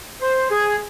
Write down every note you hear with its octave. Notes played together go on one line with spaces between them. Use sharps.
C5
G#4